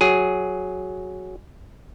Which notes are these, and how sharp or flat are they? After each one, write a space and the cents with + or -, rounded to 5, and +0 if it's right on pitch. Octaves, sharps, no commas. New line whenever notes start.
F#3 +0 G#4 +0